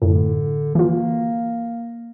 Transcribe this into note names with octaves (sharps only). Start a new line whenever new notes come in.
F#2 A2 D3
E3 A#3 F4